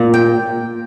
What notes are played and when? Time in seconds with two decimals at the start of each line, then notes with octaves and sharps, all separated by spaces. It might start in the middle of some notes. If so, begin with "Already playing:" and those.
Already playing: A#2
0.14 G5